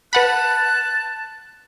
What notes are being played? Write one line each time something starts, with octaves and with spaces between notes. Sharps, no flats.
B4 F#5 A5 B5 F#6